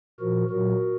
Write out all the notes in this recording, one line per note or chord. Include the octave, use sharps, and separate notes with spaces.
A#2 F3 F#4 A#4
A#2 F#3 F#4 A#4